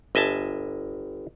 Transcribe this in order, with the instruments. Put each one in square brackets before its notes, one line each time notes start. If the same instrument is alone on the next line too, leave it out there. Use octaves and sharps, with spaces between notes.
[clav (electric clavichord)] G1 D#5 E5 G#5 A5